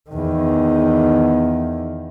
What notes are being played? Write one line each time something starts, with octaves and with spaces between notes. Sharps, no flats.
E2 D#3